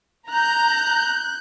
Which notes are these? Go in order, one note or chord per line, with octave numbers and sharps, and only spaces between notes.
A#5 F#6 G6